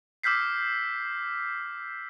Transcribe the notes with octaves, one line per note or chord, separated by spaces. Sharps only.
D6 E6 F6 G6 B6 C7